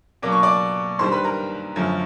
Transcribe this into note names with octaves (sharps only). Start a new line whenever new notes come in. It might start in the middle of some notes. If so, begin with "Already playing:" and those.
B2 F#3 A#3 D4 D6
C#6
D5 D6
G2 D#3 G3 C5 C6
B4 B5
A#4 A#5
F#2 D3 F3 A3 C#4